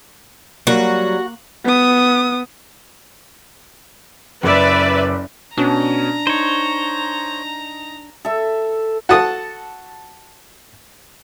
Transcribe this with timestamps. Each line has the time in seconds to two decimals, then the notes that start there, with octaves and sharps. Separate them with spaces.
0.67 F#3 G3 A#3 F#4
1.64 B3 D#6
4.43 F#1 B4 D5 E5
5.57 B2 C#4 D4 A#5
6.27 D#4 C5 C#5
8.25 A4 E5
9.09 F#4 A4 A5 D#6